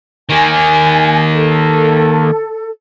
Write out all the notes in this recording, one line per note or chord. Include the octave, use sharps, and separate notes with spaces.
D#3 A#3 G#5
A4